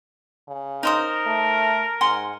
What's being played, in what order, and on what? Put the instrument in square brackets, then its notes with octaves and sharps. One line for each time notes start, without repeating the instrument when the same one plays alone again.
[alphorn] C#3
[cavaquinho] D#4 C5 D#6 [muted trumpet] A#4
[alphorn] A3
[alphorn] G#2 [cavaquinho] F#5 G#5 C6